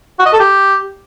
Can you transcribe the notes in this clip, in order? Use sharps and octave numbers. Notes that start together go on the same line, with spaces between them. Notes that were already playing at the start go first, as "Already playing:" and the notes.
F#4
D#5
A4
G4